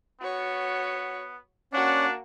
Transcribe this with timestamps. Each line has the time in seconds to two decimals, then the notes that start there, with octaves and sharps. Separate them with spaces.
0.21 B3 F#4 C#5
1.73 A#3 C#4 D4 F#4 D5 F#5